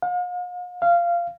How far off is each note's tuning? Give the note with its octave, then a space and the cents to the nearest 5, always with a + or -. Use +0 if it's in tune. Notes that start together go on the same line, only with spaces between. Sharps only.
F5 +45
F5 -15